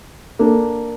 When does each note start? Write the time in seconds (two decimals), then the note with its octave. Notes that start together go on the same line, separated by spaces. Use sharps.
0.39 A#3 D4 A4